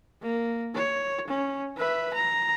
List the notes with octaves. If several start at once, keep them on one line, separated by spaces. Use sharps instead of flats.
A#3
C#5
C#4
B4 E5
A#5